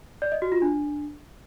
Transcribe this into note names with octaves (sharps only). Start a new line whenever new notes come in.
D5
D#5
F#4
F4
D4